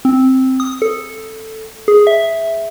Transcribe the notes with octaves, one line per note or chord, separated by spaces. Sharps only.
C4
D#6
A4
G#4
E5